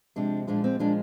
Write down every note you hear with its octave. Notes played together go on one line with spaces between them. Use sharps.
C3 F3 G#3 D4
A#2 F3 G#3 D4
C4
A#2 F3 G#3 D4